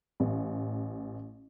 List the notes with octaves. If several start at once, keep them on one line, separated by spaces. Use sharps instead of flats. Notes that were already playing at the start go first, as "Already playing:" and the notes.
A1